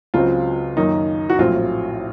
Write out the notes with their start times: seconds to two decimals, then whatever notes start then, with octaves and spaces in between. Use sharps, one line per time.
0.14 C#2 C#3 F#3 C4 F4
0.76 F#2 D#3 A#3 D#4
1.30 F#4
1.38 A#1 A2 F#3 C4 F4